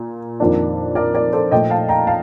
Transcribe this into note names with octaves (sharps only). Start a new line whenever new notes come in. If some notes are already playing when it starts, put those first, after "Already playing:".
Already playing: A#2
F2 D#3 A#3 D4
A#4 D5
A#4 D5
A4 C5
A#2 F3 A3 D#5 G5
F5 A5
G5 A#5
F5 A5